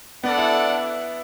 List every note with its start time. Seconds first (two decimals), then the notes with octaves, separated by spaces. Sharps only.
0.23 B3 D4 A4 D5 F#5
0.38 E4